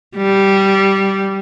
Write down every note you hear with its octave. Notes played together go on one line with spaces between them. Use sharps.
G3